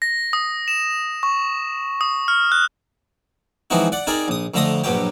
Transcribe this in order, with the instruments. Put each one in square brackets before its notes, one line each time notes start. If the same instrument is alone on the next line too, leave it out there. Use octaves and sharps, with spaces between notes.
[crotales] A#6
D#6
E7
C#6
D#6
F6
F#6
[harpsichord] E3 F3 G#3 C4 D#4 F#4
D5 F#5
C4 D#4 G#4 A#4 D5
A#1 D#6
F2 D3 A3 A#5 C6 D#6
A#1 G2 F#3 G4